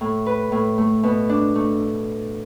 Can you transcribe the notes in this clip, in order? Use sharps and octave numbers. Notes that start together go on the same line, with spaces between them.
A2
B4
A2
A3
B2
D4
A3